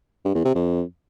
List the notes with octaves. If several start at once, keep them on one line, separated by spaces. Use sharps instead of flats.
G2
E2
C3
F2